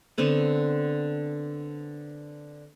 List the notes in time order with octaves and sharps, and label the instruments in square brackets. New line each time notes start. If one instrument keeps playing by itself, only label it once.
[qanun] D3 B3 C4 B4